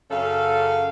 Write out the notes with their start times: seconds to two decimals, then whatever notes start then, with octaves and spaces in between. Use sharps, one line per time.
0.11 F#2 C#3 A4 F5